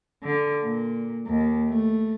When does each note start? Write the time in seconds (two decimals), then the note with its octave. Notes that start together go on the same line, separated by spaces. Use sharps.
0.22 D3
0.62 A#2
1.25 D#2
1.68 A3